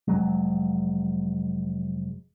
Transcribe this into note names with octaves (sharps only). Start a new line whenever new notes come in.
F1 F#3 G#3